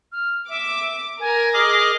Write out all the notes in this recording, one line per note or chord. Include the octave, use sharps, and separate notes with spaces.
F6
E5 D6
A#4 G#5
G#4 D#5 D6 F6